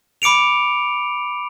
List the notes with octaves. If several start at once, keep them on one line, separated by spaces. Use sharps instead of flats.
B5 D6 C#7 D7 F7